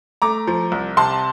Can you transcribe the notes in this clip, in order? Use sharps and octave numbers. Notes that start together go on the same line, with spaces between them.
A3 A#5 D6
F3
C2
C3 A5 C6